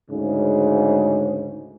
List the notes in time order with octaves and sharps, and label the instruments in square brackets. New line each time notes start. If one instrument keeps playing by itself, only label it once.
[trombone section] D2 G#2 C#3